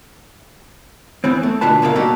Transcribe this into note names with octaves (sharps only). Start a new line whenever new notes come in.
E3 B3 C4
A3
B2 D3 F4 B4 A5
C#3 A#3 A4 D5 F5
B2 G3 D#4 F#4 G4 A4